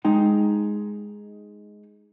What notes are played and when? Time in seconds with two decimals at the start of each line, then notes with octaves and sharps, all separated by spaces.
0.05 G#3 D#4 G5